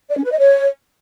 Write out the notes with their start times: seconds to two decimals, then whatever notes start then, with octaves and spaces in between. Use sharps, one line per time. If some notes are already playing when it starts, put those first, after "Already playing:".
0.10 D5
0.17 C#4
0.24 B4
0.31 D#5
0.38 C#5